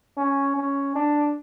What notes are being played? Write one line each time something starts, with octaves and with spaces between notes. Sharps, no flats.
C#4
C#4
D4